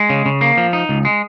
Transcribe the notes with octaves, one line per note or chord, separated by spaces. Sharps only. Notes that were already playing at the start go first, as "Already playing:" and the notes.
Already playing: G#3
C#3
C#3
A#3
F3
D#4
C#2
G#3